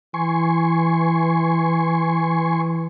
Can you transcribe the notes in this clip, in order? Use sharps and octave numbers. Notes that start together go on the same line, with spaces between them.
E3 G#5 C6 C#6